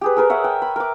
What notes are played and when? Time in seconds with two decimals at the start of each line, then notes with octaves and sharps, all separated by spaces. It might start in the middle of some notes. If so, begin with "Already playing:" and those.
0.01 G4 G#4 B4
0.17 G#4 A#4 B4
0.30 C#5 E5 F#5
0.44 G5
0.62 B5
0.76 A#4 D6